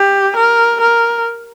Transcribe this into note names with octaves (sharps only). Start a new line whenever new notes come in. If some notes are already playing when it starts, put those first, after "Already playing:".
Already playing: G4
A#4
A#4